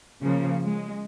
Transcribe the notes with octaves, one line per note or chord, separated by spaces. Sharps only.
C#3 F3 A#3
G#3